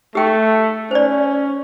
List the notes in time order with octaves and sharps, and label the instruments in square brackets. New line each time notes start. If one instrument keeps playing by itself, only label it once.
[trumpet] A3 [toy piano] G4 G5
[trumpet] C#4 [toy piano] C5 D5